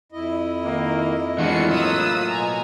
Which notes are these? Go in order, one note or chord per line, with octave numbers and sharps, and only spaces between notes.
F2 E4 D#5
D#3 A#3
A2 E3 G#3 A#3 D4 F4 F#4 C#7
F#3 B5 D#6 E6
B2 G#5 A#5